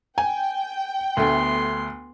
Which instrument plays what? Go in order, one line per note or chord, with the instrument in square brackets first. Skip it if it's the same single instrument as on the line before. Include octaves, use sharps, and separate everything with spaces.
[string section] G5 [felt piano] G#5
[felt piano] D2 A3 [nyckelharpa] B3 C6